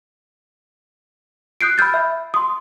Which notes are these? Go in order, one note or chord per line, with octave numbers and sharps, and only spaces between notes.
D#6 F#6 G6 C7 D7
B5 E6 F6 G6 A6
E5 B5
C6 D#6